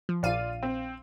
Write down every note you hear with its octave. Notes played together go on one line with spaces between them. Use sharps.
F3
A#1 F4 D5 F5 D#7
C4